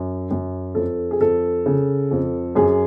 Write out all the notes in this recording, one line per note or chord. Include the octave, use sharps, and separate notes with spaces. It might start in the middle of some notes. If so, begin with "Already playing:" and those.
Already playing: F#2
F#2
F2 A4
G#4
F2 A4
C#3
F2
F#2 G#4